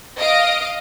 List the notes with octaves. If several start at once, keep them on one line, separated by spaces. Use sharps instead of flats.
D#5 F5 D7